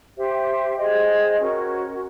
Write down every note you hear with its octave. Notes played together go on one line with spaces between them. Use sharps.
G4 C5 E5 G5
G#4 C5 D#5 G5
C#4 F#4 A#4